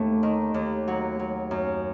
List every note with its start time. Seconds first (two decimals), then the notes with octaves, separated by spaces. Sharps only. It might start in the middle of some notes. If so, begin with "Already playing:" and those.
Already playing: D#2 A3
0.23 D#3
0.54 D#2
0.88 F#3
1.19 F#3
1.51 F#2